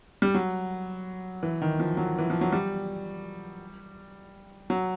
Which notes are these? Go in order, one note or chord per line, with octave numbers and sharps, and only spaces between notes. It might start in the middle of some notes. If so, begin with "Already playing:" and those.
G3
F#3
E3
D#3
F3
F#3
E3
F3
F#3
G3
F#3